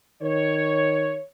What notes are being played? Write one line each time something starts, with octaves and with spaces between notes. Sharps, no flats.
D#3 C#5